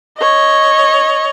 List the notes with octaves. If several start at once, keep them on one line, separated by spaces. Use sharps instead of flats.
C#5 D#5